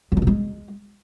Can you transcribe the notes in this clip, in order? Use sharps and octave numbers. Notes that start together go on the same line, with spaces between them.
F#2
D#3
B2
G#3